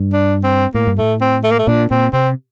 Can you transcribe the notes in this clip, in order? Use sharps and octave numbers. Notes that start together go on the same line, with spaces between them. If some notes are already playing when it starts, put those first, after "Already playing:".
Already playing: G2
D4
C4
A2 A#3
G2
A2 A3
C4
A3
A#3
A3
A#2 D4
A#2 C4
C3 C4